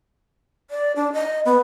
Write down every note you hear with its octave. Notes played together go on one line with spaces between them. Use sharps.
D5
D4
D#5
B3